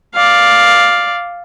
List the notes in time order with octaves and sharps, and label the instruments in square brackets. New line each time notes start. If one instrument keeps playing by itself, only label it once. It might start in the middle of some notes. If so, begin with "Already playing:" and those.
[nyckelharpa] D5 F5